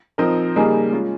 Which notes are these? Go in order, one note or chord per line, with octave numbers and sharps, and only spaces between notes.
F3 C4 D#4 A#4 D#5
C#3 G3 A#3 D#4 G#4
G#3 C#4 F4